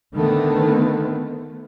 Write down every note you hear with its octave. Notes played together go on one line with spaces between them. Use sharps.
D3 D#3 A3 B3